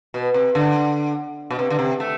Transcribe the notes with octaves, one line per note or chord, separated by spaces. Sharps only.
B2
C3
D3
B2
C3
D3
C3
A3